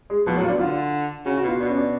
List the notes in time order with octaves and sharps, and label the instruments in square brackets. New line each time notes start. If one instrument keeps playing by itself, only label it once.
[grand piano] G#3
[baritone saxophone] B2 [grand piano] F3
[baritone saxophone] A2 [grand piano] F#3
[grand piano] F4
[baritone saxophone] B2 [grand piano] D4
[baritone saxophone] D3 [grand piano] F4
[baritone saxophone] C#3 [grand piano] F#4
[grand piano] F#4
[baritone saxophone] B2
[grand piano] F4
[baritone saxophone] B2 [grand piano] D4
[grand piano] C#4
D4